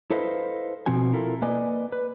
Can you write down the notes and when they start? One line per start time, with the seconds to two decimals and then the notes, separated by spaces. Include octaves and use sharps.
0.10 E4 A4 B4 C5 D#5 F5
0.86 B2 F3 C4 F#4 G#5
1.13 E4 F4 A4 A#4
1.42 A#3 B4 D5 D#5 G#5
1.92 B4